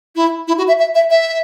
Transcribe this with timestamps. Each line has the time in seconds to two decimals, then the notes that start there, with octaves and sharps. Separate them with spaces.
0.16 E4
0.48 E4
0.58 F#4
0.68 E5
0.79 E5
0.95 E5
1.10 E5